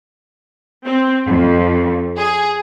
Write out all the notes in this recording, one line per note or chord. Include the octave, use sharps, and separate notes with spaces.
C4
F2
G#4